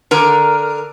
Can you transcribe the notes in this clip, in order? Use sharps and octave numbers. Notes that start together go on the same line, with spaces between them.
D3 A#4